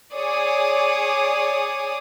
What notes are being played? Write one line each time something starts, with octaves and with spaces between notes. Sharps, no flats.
G#4 C#5 D5 D#6